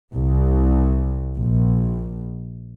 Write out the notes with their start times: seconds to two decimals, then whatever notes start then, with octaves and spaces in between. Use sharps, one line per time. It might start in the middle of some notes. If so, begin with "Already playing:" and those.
0.13 C2
1.36 A#1